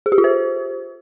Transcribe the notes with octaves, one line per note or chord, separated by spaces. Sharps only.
G#4
G4
F4
C5